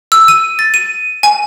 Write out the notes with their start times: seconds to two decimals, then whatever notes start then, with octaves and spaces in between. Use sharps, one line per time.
0.12 E6
0.28 D#7
0.59 A6
0.74 D#7
1.23 G#5